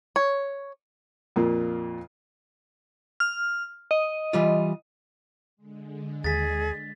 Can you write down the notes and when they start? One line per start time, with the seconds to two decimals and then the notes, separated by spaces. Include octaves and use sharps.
0.16 C#5
1.36 F2 A#2 A#3
3.20 F6
3.91 D#5
4.33 E3 G3 F4
5.57 D3 G#3
6.24 D#2 G#4 A6 B6